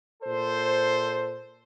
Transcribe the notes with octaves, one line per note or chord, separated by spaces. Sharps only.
A#2 A4 C5